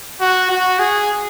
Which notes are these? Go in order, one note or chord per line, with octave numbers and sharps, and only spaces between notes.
F#4
F#4
G#4